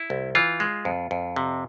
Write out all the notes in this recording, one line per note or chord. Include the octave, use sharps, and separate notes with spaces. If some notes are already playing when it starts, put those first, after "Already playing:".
Already playing: E4
C2
E3 F4
G#3
F2
F2
C3